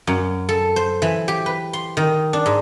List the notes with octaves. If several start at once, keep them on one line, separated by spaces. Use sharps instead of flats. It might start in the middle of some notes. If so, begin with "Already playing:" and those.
F#2
A4
C5
E3
G4
B4
C6
D#3
D4
G#2